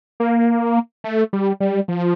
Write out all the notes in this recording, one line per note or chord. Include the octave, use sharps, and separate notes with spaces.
A#3
A3
G3
G3
F3